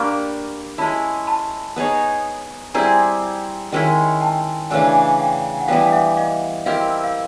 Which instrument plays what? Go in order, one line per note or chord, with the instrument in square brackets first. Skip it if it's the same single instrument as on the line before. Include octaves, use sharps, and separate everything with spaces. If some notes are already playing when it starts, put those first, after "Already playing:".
Already playing: [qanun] A#3 D4 G4 [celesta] B5 C#6
[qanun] G#3 C#4 E4 [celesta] A5 B5
[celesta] A5 B5
[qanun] B3 D#4 G#4 C#5
[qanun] G3 C4 E4 G#4 [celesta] G#5 A#5
[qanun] D#3 G#3 C#4 E4
[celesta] G5 A5
[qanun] C#3 E3 A3 D4 [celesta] F#5 G#5
[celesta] F5 G5
F#5
[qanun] E3 G3 B3 [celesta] F5 G5
[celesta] E5 F#5
D#5 F5
[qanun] C4 E4 G4 A#4 [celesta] D#5 F5
[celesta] F5